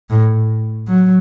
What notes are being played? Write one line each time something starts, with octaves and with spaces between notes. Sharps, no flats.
A2
F#3